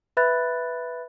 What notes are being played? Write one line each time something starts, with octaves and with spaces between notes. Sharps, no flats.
B4 E5 B5 F#6 A6